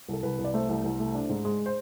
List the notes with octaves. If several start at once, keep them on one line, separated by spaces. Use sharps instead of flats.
C2 A4
C2 B4
C2
D5
A3 C5
C2
C2
A3
D4
G#2
G#3
C5